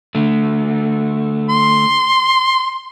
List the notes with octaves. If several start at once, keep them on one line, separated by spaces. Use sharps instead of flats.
D3 A3
C6